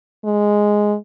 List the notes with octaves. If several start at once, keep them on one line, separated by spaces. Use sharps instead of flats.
G#3